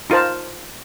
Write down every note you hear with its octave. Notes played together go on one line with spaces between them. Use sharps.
D#4 F4 A#4 C5 A5